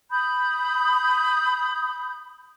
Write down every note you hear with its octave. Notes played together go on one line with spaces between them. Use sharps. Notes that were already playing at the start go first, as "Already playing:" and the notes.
B5 D#6 G6